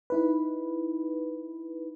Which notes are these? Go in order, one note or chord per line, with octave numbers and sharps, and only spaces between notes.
D#4 E4 B4